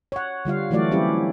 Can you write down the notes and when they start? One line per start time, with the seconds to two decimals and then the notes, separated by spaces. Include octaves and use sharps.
0.12 C#5 F#5
0.45 D3 G3 F4 F5
0.71 E3 F#3 A3 F#4 D5
0.91 F#3 G3 C4 C#4 E4 G4